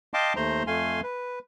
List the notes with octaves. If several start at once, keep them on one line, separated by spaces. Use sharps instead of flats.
D#5 F5 G5 A5 C6 D6
D#2 A3 C5 A#5 C6
F2 A3 F5 G#5 C6
B4